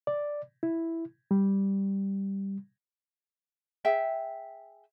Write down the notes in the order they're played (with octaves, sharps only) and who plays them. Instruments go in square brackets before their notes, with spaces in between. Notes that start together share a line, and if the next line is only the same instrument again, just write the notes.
[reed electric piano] D5
E4
G3
[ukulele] G#4 E5 G5